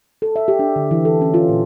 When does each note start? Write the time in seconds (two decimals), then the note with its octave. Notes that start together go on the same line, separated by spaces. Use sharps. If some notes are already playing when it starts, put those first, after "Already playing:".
0.22 A4
0.36 E5
0.48 G4
0.59 D4
0.76 D3
0.91 E3
1.05 A4
1.21 C#4
1.34 F4
1.49 A#2